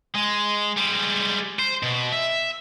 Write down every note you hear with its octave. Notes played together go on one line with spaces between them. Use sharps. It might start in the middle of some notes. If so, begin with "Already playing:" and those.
G#3
G3 G#3
C5
B2
E5